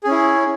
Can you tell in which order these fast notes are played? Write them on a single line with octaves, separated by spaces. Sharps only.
G#4 C#4 E4